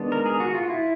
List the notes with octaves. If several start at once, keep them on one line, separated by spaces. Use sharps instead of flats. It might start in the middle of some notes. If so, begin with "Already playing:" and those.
Already playing: D#3 G#3 B3 D4
A#4
G#4
F#4
F4
E4